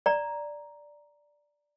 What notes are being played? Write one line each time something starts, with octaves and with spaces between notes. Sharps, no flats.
D5 A#5